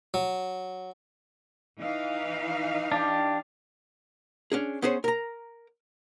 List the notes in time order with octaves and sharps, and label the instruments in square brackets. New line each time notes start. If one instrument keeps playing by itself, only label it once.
[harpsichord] F#3
[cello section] E3 D#4 F5
[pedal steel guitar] D4 G4
[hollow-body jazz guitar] C#4 D4 G#4
B3 C#4 G#4 A#4 C5 C#5
A#4 A#5